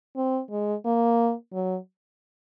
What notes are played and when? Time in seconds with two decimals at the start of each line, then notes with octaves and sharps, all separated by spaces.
0.17 C4
0.51 G#3
0.85 A#3
1.53 F#3